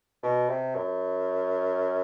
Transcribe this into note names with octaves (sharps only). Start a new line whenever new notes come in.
B2
C3
F#2